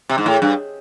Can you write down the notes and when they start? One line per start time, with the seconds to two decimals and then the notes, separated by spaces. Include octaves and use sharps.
0.09 C3
0.18 G#2
0.26 A2
0.42 G2